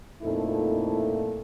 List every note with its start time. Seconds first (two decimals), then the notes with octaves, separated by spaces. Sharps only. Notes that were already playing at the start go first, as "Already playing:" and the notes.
0.22 F2 A#2 A3 D#4 E4 A4